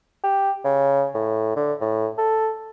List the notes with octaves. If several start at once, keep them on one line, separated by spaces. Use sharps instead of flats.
G4
C#3
A2
D3
A2
A4